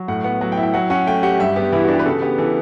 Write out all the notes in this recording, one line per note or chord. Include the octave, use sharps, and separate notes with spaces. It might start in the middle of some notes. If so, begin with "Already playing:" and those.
Already playing: F#3
A2 F#5
B3 F#5
F#3 F#5
G5
E4
G5
F#3 F#5
C#4 F#5
A3 G5
G4 F#5
G2 E5
B3 G4
E3 E4
D4 F#4
G4 B4
C#3 A4
B3 G4
E3 A4